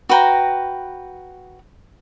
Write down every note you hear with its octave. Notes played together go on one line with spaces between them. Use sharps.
F#4 B4 G5 A#5